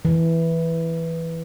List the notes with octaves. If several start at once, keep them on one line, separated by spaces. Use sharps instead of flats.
E3